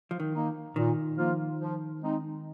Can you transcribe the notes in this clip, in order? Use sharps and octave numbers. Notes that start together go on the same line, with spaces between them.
F3
D#3
A#3 D#4
A#2 D#3
F3 A#3 F4
F3
G#3 C4 D#4